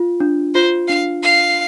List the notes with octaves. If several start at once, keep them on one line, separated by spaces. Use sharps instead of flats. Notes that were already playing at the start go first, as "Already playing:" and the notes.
Already playing: F4
D4
F4 C5
D4 F5
F5